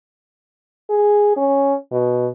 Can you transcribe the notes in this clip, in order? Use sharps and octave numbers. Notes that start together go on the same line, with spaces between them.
G#4
C#4
B2